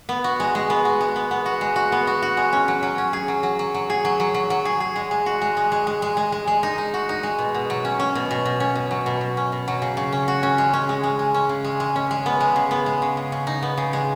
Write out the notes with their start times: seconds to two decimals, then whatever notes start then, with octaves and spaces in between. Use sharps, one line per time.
0.09 B3
0.24 F#4
0.40 G#3
0.55 G#3
0.70 B3
0.85 F#4
1.01 G#3
1.16 B3
1.31 B3
1.46 F#4
1.61 G#3
1.76 F#4
1.92 B3
2.07 F#4
2.22 F#4
2.37 G#3
2.53 C#4
2.68 F#3
2.83 F#3
2.98 C#4
3.13 G#4
3.28 F#3
3.43 F#3
3.59 F#3
3.74 F#3
3.90 G#4
4.05 F#3
4.20 F#3
4.34 F#3
4.50 F#3
4.65 G#4
4.80 G#4
4.96 G#3
5.11 G#3
5.26 F#4
5.42 G#3
5.57 G#3
5.72 G#3
5.87 G#3
6.02 G#3
6.17 G#3
6.32 G#3
6.47 G#3
6.63 D#4
6.78 D#4
6.94 F#4
7.09 D#4
7.23 G#3
7.38 B2
7.54 B2
7.70 F#3
7.85 C#4
8.00 C#4
8.15 B2
8.31 B2
8.45 B2
8.60 C#4
8.75 B2
8.91 F#3
9.06 B2
9.21 B2
9.37 C#4
9.52 B2
9.68 F#3
9.82 C#3
9.97 C#3
10.12 C#4
10.28 F#4
10.43 C#4
10.58 G#3
10.73 C#4
10.89 G#3
11.03 G#3
11.19 G#3
11.34 C#4
11.49 C#3
11.64 G#3
11.80 G#3
11.96 C#4
12.11 G#3
12.26 B3
12.40 G#3
12.56 C#3
12.71 B3
12.86 G#3
13.02 C#3
13.17 C#3
13.32 C#3
13.47 D#4
13.63 B3
13.77 C#3
13.93 G#3